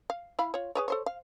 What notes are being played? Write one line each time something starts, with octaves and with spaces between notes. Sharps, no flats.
F5
E4 F5 B5
F4 C#5
G#4 B4 C#5
A4 C5 C#5
F5